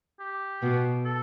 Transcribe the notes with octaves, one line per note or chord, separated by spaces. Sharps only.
G4
B2
A4